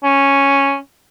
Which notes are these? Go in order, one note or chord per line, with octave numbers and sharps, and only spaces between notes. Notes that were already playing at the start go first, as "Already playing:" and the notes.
C#4